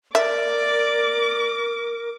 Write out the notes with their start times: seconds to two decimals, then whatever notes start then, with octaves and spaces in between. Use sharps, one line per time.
0.15 A#4 D5 E5 D6